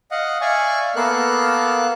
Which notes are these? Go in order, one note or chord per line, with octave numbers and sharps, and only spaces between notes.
D#5 F5 F#5
D5 E5 F5 G#5 C#6
A#3 B3 A4 A#4 F5 F#6